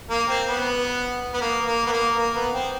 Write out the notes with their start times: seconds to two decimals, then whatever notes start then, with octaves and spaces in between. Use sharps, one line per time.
0.10 A#3
0.28 C4
0.48 B3
1.34 B3
1.41 A#3
1.67 A#3
1.87 B3
1.92 A#3
2.17 A#3
2.35 B3
2.54 C4